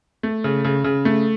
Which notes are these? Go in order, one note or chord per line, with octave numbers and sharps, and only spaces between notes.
A3
C#3
C#3
C#3
A3